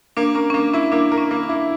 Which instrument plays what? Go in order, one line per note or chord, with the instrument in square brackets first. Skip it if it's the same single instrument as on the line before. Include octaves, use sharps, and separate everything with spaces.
[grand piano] A#3 [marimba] D4
[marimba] C#4 [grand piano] A#4
[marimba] C#4
[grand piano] A#3 [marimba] D4
[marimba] C#4 [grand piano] E4
[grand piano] A#3 [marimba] D4
[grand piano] A#4
[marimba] C#4
[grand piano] A#3
[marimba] D4
[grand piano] E4